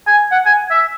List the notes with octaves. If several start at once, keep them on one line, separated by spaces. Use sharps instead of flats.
G#5
F#5
G#5
E5